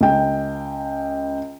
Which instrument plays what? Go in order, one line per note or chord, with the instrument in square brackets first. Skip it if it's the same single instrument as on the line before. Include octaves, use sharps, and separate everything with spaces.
[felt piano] C#2 G5